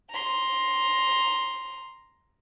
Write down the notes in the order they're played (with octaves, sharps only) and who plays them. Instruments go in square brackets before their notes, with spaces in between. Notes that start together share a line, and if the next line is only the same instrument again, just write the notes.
[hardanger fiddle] A#5 C6